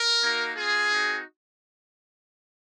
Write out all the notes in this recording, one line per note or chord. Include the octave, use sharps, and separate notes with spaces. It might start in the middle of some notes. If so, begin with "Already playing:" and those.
Already playing: A#4
A#3 D#4 F#4
C4 F4 G#4
C4 D#4 F#4